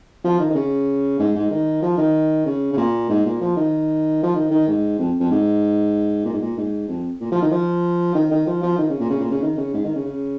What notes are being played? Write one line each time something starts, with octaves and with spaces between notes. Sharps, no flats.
F3
D#3
D#3
C#3
G#2
G#2
D#3
F3
D#3
C#3
C#3
A#2
G#2
A#2
F3
D#3
F3
D#3
D#3
G#2
F2
F2
G#2
A#2
G#2
A#2
G#2
F2
A#2
F3
D#3
F3
D#3
D#3
F3
F3
D#3
C#3
A#2
C#3
A#2
C#3
D#3
C#3
G#2
D#3
C#3
C#3